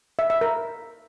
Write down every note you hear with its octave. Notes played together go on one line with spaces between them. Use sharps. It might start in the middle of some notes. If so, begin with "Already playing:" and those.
E5
E5
A#4